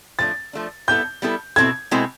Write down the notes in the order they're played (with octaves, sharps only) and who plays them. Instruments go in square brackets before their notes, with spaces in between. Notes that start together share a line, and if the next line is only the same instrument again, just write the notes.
[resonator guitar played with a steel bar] F3 A3 D4 [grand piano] A6
[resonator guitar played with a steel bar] F3 A3 D4
[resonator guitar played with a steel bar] G3 B3 E4 A4 [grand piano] G6
[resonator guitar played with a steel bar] G3 B3 E4 A4
[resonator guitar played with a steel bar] B2 G#3 C4 E4 A4 [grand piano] G#6
[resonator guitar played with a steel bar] B2 G#3 C4 E4 A4